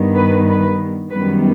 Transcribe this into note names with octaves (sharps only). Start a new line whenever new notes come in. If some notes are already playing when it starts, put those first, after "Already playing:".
Already playing: G2 D#3 G3 B3
B4
B4
F#2 D#3 G3 B3 B4